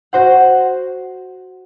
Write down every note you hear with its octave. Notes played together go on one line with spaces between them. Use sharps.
F#4 C5 F#5